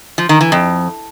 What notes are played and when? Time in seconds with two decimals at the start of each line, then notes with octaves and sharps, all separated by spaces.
0.18 F3
0.29 D#3
0.41 E3
0.52 F2